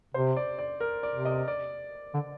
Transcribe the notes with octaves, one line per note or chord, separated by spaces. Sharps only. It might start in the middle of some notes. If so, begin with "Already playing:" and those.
C3 C5
D5
D5
A#4
D5
C3
D#5
D5
D3